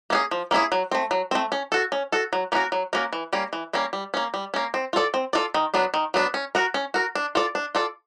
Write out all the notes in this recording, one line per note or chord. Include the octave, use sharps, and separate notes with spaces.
A#3 C#4 E4 G#4
F3
A#3 C#4 E4 G#4
F#3
A3 C4
F#3
A3 C4
C#4
F#4 A4
C#4
F#4 A4
F#3
A#3 C#4 F#4 A#4
F#3
A#3 C#4 F#4 A#4
E3
G3 A#3 C#4
E3
G3 A#3 C#4
G3
A#3 C#4
G3
A#3 C#4
C4
F4 A4 D5
C4
F4 A4 D5
D#3
F#3 B3 D4
D#3
F#3 B3 D4
C#4
F#4 A#4
C#4
F#4 A#4
D4
F4 A4 D5
D4
F4 A4 D5